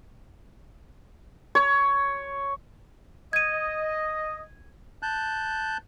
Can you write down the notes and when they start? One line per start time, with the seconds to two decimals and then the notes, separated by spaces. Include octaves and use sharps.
1.55 C#5
3.33 D#5 G#6 D#7
5.03 A5 F#6 G6